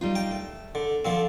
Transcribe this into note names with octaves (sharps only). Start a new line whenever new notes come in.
G3 D#4 F4
G5
A3
D3
D3 F3 C4